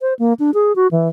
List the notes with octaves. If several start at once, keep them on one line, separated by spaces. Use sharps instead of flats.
C5
A#3
D4
G#4
F#4
E3